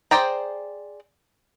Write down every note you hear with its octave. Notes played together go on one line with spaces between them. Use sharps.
G#4 C5 D5 G5 A#5